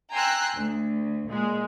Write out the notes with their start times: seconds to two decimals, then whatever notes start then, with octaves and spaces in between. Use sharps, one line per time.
0.11 G5 G#5 A#5 C6 E6 F#6
0.57 D2
1.29 A#2 G#3